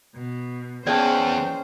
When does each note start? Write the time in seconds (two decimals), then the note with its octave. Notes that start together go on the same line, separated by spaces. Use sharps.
0.15 B2
0.87 E2 C#4 G#4 B4 C5 D5 G5 A5